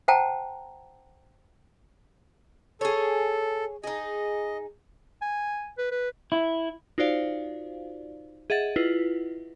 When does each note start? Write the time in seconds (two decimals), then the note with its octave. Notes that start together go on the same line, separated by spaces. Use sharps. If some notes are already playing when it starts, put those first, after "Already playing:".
0.08 C5 F#5 G5 A5 A#5
2.81 G#4 A4 C#5
3.84 D#4 G#4 D#5
5.22 G#5
5.78 B4
5.92 B4
6.32 E4
6.98 D#4 F4 F#4 C5 D5 F5
8.50 G#4 D#5 E5 F#5 A6
8.76 E4 F4 B4